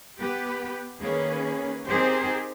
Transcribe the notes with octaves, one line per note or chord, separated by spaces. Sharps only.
B3 G4 B4
D#3 A#3 C#4 G#4 B4
C4 D#4 G4 G#4 A#4 C5